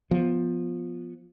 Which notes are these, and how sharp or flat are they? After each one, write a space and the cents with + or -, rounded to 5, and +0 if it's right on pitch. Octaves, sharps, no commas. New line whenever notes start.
F3 +5 B3 +0